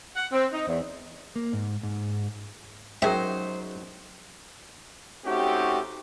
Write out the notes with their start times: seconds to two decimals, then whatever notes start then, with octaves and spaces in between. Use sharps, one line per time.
0.16 F#5
0.32 C4
0.53 D#4
0.67 E2
1.36 A#3
1.53 G#2
1.83 G#2
3.02 F#3 C#4 D#4 G#4 A#4 C5 E5
5.26 A3 C4 C#4 D#4 F#4 G4